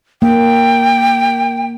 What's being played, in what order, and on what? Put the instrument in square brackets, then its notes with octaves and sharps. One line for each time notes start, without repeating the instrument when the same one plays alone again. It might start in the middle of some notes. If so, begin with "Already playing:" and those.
[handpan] A#3 [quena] G5